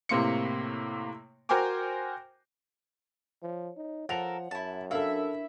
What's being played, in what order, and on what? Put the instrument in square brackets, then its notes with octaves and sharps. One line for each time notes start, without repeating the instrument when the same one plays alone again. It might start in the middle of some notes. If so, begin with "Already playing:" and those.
[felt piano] A2 C3 A#3 C6 C#7
F#4 A#4 C5 G5 G#5 D6
[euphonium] F3 [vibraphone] C#5
[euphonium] D#4
[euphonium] F3 [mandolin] A4 A#4 [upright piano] F#5 F7
[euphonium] F#2 [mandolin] E4 A5
[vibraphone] D4 A#4 [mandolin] E4 E5 [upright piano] A4 F5